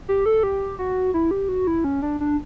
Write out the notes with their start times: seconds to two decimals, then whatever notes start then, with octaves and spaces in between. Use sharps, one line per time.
0.08 G4
0.26 A4
0.43 G4
0.79 F#4
1.14 E4
1.31 G4
1.49 F#4
1.67 E4
1.84 C#4
2.02 D4
2.21 D4